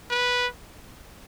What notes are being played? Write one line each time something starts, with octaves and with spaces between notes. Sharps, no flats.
B4